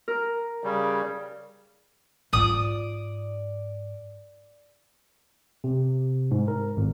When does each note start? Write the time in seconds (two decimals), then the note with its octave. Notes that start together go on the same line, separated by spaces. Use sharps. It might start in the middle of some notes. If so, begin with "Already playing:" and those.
0.08 A#4
0.64 C#3 G3
2.33 G#2 F4 D5 D#6
5.64 C3
6.31 G#2
6.48 A#4
6.77 G#1